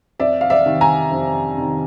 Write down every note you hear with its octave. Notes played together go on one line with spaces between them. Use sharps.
F2 D5 E5
F5
D5 E5
C3 D#3
G#5 A#5
F2
C3 D#3